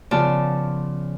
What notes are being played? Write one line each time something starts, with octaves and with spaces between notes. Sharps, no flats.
C#3 F3 B3 F4 D5 A5